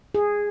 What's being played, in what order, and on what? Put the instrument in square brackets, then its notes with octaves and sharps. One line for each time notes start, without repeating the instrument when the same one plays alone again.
[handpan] G#4